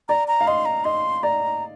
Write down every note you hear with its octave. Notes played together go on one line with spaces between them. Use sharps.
D5 A#5
A#5
F5
D#5 C6
A#5
D#5 C6
D5 A#5